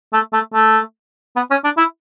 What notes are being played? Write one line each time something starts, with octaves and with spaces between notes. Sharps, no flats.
A3
A3
A3
B3
C#4
D4
E4